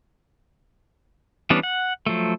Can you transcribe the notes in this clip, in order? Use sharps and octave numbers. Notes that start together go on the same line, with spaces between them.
E3 G3 B3 C#4 D4
F#5
F3 F#3 A3